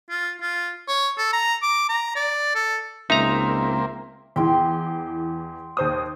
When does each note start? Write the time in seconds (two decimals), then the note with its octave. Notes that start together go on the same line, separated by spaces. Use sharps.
0.09 F4
0.41 F4
0.88 C#5
1.18 A4
1.33 A#5
1.62 D6
1.89 A#5
2.15 D5
2.55 A4
3.10 C#2 A#3 C4 D#4 E5 A#5
4.36 E2 E3 G5 C6
5.77 D#2 C5 D#6